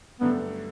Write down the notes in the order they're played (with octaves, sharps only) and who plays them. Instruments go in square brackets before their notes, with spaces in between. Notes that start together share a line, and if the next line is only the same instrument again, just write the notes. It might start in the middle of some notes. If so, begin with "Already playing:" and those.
[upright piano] G2 D3 F#3 A3 [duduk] B3